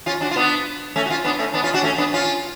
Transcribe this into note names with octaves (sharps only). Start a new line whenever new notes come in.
C#4 F4
D4 F#4
F4
B3 D4
A3 C#4
F#4
C#4 F4
B3 D4
A3 C#4
B3 D4
C#4 F4
D4 F#4
A3 C#4
B3 D4
C#4 F4